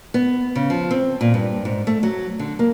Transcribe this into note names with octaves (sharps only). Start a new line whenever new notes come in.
B3
C#3
F3
C4
A#2
G2
G#2
A3
F#3
D3
A#3